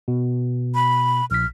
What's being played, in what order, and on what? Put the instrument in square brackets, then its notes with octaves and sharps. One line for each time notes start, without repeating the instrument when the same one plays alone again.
[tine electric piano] B2
[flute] B5
[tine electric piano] A#1 B6 [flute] F6